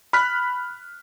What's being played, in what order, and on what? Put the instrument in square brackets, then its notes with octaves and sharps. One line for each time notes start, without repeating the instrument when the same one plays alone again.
[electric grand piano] B5 F6 F#6 B6